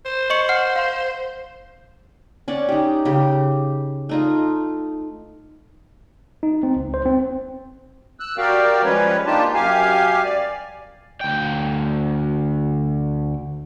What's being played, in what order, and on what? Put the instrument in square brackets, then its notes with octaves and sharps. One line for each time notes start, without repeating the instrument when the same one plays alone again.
[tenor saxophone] C5
[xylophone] D#5 C#6 C#7
F#5 F6 C7
F5 C6
[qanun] C#4 D5 F#5
D#4 G4
C#3 G4
A3 D#4 F4
[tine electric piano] D#4
C4
C#2
C5
C4
[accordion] E6 F#6
F#4 G4 A#4 D5 F5 G5
F3 G3 G#3 C#4 B4 C#5
A#3 D4 D#4 F4 G4 A5
F#2 G4 F5 G#5
D5
[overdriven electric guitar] D2 G5